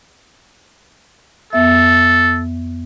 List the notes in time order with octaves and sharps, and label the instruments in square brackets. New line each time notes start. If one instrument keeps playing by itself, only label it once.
[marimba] F2 B3 E5 [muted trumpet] A4